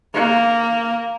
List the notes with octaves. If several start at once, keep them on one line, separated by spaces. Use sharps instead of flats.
A#3